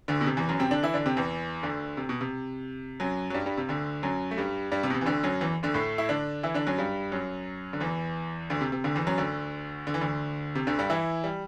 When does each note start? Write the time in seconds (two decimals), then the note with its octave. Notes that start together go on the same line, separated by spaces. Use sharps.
0.08 D2 D3
0.21 B2
0.26 C3
0.37 E2 E3
0.49 F#2 F#3
0.60 C3 C4
0.71 D3 D4
0.83 E3 E4
0.94 D3 D4
1.06 C3 C4
1.17 E2 E3
1.63 D2 D3
1.97 C3
2.09 B2
2.21 C3
3.00 F#2 F#3
3.30 F#3
3.34 G2 G3
3.46 G2 G3
3.58 C3
3.69 D2 D3
4.03 F#2 F#3
4.31 A3
4.38 G2 G3
4.72 G2 G3
4.83 C3
4.90 B2
4.94 C3
5.01 E3
5.06 D2 D3
5.23 F#2 F#3
5.41 E2 E3
5.63 D2 D3
5.74 A2 A3
5.98 E4
6.09 D3 D4
6.43 E3 E4
6.54 D3 D4
6.67 F#2 F#3
6.78 G2 G3
7.12 F#2 F#3
7.73 D3
7.80 E2 E3
8.50 D2 D3
8.61 C3
8.72 C3
8.84 D2 D3
8.95 E2 E3
9.07 F#2 F#3
9.18 D2 D3
9.87 D3
9.94 E3
10.01 D2 D3
10.55 C3
10.67 D2 D3
10.79 G2 G3
10.90 E3 E4
11.24 G3